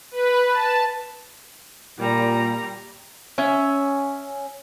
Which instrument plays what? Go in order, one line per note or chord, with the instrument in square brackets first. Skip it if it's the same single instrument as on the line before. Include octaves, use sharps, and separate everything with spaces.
[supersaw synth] B4
A5
[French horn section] A#2 [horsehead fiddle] G3 A#5
[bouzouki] C#4 E5